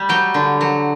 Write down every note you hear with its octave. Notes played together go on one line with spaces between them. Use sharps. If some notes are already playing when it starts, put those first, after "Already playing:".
Already playing: G3 B5
F#3 G5
D3
F#3